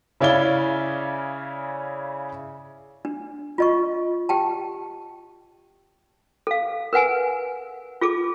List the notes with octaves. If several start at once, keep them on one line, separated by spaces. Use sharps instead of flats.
C#3 C#4 E4 D5 F5 G7
D4
F4 D#5 C#6
G4 G5 A5
A4 F5
A#4 B4 F#5 G#5
F4 G#4 A4 D6